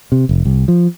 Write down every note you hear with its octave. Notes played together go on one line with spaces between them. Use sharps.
C3
F1
C2
F3